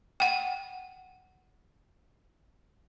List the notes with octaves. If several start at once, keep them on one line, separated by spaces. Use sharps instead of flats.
F#5 G5